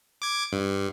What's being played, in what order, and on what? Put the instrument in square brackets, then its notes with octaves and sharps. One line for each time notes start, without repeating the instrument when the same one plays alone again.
[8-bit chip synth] D6 G#6
G2